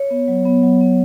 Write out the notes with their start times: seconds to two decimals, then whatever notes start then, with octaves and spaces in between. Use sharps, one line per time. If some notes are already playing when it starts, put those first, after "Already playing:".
Already playing: C#5
0.11 B3
0.28 F#3
0.45 B3
0.63 F#3
0.81 B3